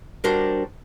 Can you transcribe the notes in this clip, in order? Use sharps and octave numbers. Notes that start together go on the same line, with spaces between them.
G3 D4 F#4 A#4 C5